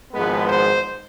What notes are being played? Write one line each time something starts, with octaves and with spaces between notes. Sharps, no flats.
G#1 G#2 F3 G#3 B3 B4
C5